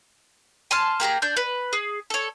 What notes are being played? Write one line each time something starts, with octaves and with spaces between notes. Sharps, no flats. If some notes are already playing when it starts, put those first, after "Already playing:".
G#5 A5 C6 F6
A#3 G4 G#4 A#5
D4 G6
B4
G#4
A4 C#5